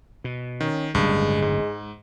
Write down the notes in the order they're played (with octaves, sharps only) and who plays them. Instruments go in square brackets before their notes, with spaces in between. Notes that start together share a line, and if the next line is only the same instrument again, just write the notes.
[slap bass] B2
[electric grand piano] D#3 [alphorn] C#4
[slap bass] D1 G1 C#3 [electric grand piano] G2 [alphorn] G#3
[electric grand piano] G#2